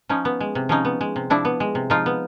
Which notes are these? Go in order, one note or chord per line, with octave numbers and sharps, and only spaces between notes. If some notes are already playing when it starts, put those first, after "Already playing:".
F3 C#4 D#4
B3
G#3
C3
F3 C#4 D#4
B3
G#3
C3
F3 D4 E4
B3
G#3
C3
F3 D#4 F4
B3